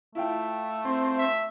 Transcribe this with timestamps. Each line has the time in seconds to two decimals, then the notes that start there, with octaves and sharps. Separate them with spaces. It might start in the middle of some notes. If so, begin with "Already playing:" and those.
0.15 A3 E4 F4 G5
0.85 C4
1.18 E5